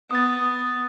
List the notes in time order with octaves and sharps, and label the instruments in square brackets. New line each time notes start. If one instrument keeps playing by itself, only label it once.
[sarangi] B3 [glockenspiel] D#6 A6